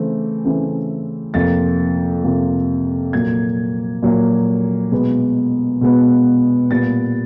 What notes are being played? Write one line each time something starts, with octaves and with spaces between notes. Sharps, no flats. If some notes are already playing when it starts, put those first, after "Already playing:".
Already playing: C#3 E3 A3 C4
C#3 E3 A3 C4
F2 C3 F3 A#3 A6
F2 C3 F3 A#3
A#2 F#3 A#3 G#6
A#2 F#3 A#3
B2 G#3 B3
B2 G#3 B3
A#2 G3 B3 A6